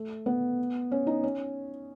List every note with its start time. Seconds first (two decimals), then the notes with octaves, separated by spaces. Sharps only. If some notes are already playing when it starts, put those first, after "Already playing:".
Already playing: A3
0.26 B3
0.92 C#4
1.07 D#4
1.24 C#4